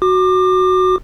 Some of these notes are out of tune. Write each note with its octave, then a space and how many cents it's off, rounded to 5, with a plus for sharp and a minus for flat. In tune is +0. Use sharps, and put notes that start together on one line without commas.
F#4 +0 D6 +30